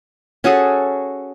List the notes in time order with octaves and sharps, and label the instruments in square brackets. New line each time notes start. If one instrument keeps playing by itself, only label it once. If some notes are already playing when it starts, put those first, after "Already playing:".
[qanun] C#4 F#4 G#4 A4